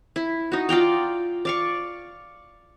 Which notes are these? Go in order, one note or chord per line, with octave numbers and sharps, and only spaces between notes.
E4
D#4 F#4
F4 D5 G5 A#5
D5 F5 C#6